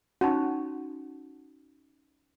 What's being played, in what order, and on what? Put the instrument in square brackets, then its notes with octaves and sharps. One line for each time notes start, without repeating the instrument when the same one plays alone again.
[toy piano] C#4 D#4 [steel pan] F#4